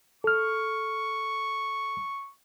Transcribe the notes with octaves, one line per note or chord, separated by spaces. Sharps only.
A4 C#6 F6